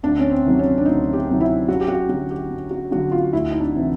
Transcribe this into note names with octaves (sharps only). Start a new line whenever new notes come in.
D2 D4
C#4
C4
C3 D#3 F#3
C#4
D4
D2 D#4
G4
C3 D#3 F#3
E4
F#2 F#4
G4
F#4
D3 F#3 F#4
G4
F#2
F#4
D3 F#3 F#4
F4
D2 E4
D#4
D4
C3 E3